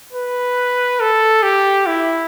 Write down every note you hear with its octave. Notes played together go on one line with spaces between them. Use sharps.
B4
A4
G4
E4